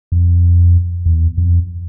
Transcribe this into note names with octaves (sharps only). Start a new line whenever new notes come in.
F2
E2
F2